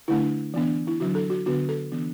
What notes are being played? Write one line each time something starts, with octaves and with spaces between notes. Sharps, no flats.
D3 A3 D4 E4
E3 B3 D4
E4
D3 F#3 D4 F#4
A4
F#4
D3 B3 D4 F#4
A4
E3 B3 D4